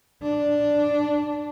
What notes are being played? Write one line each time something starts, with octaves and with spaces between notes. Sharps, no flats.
D4